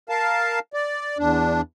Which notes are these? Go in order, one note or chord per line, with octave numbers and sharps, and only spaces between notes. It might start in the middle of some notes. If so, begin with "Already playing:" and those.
A#4 F5 A5
D5
E2 D4